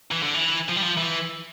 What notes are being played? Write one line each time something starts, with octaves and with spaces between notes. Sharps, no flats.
E3
D3
E3
F3
G3
F3
E3